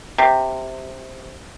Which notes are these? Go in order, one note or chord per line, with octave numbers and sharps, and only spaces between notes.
C3